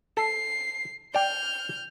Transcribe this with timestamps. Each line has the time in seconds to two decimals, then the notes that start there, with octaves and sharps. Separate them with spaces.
0.17 A4 C7
1.14 D5 G5 F6 G6